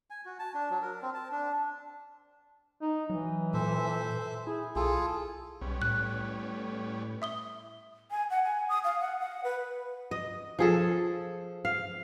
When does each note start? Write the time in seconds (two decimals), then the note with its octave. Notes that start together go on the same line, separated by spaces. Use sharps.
0.10 G#5
0.25 F#4
0.39 A5
0.54 D4
0.70 F#3
0.82 A#4
1.02 C4
1.14 A5
1.31 D4
2.82 D#4
3.10 E3 F#3
3.54 A#2 A4 C5 E5
4.47 E4 G#4
4.76 B1 F4 G#4 A4
5.61 B1 G3 B3 C#4
5.82 A2 F#6
7.22 E5 D#6 G7
8.11 G#5
8.30 F#5
8.43 G#5
8.69 D#6
8.84 F5
9.01 F#5
9.19 F#5
9.44 B4
10.11 D#5
10.59 F3 G#4 A4
11.65 F5